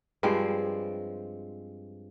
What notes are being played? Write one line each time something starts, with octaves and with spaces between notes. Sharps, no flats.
G2 F3 G#3 C4